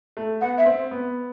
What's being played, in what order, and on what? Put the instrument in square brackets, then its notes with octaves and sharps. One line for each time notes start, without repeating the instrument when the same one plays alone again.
[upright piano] A3
[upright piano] B3 [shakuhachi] F#5
[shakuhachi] E5
[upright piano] C4
B3